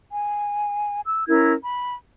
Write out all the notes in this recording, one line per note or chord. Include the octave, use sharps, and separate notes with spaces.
G#5
E6
C#4 E4 A#4 G#6
B5